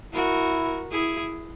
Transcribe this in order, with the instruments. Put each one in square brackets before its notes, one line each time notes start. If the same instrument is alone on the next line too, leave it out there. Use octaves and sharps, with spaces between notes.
[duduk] E4 [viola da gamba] F#4 A#4
[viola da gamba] E4 G#4